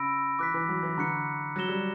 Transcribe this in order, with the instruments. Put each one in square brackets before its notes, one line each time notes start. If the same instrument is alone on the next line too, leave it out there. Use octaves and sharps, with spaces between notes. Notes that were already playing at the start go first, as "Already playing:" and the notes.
Already playing: [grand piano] C#3 [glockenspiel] B5 E6 A#6 D7
[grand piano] E3 [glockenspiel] D6 F#6 B6
[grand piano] E3
F#3
E3
[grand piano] D3 [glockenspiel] A#5 C#6 F#6 C#7
[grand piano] F#3 [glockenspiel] F#6 A#6 E7 G7
[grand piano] G3